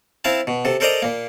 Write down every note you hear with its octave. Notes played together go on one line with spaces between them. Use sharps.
C4 E4 F5 A5
B2
C3 A4
A4 A#4 C5 D5 D#5 A#5
A#2 A#3